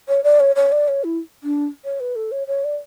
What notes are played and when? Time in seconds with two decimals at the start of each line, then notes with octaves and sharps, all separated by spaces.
0.08 C#5
0.24 D5
0.40 C#5
0.56 C#5
0.72 D5
0.88 C#5
1.04 E4
1.43 D4
1.84 C#5
2.00 B4
2.16 A4
2.32 C#5
2.47 C#5
2.64 D5